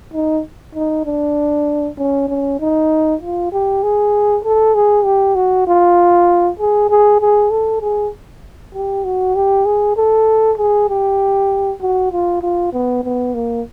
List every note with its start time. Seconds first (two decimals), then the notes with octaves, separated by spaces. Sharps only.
0.14 D#4
0.75 D#4
1.05 D4
1.98 C#4
2.28 C#4
2.60 D#4
3.21 F4
3.52 G4
3.83 G#4
4.44 A4
4.75 G#4
5.05 G4
5.35 F#4
5.67 F4
6.60 G#4
6.90 G#4
7.21 G#4
7.50 A4
7.81 G#4
8.74 G4
9.05 F#4
9.35 G4
9.66 G#4
9.97 A4
10.58 G#4
10.89 G4
11.81 F#4
12.12 F4
12.42 F4
12.73 B3
13.04 B3
13.34 A#3